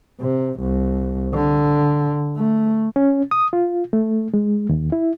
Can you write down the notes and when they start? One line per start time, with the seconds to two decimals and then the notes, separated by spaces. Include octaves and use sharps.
0.21 C3
0.60 C2
1.34 D3
2.37 A3
2.96 C#4
3.31 D#6
3.53 F4
3.93 A3
4.34 G#3
4.69 D#2
4.92 E4